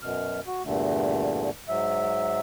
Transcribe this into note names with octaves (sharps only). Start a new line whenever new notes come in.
F#2 B2 F6
F#4
E2 G2 A#2 D3 A3
G#2 F#3 E5